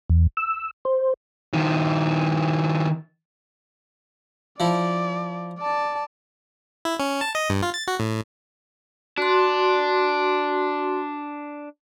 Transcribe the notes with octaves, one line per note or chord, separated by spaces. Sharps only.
E2
E6
C5
D#3 F3
F3 E4 D5
D5 A5
E4
C#4
A5
D#5
G2
F4
A6
F#4
A2
D4 F#4 C6